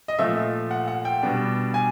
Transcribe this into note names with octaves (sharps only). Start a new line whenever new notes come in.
D#5
A#2 F3 A3 E5
F#5
F#5
G5
B2 G3 B3 D4
G#5